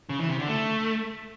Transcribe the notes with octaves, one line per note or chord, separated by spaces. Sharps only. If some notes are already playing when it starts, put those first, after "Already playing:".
C#3
E3
C3
D3
A3